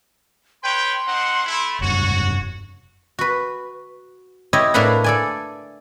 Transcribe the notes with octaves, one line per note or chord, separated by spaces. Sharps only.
B4 C#5 G5 C6
C4 D#4 F#5
A3 E4
F1 G2 F#4 C#5
F#4 B4
E4 G4 C#5 D#5
A2 A#3 D4 E4 B4 F#5
A4 D5 G#5